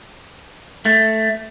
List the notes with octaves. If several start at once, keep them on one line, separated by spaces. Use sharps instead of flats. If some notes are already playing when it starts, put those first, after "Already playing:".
A3